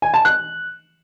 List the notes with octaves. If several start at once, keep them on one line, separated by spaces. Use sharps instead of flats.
G#5
A5
F#6